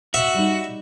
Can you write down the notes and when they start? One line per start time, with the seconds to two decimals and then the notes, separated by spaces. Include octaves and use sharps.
0.14 F#4 E5
0.34 G3 D#4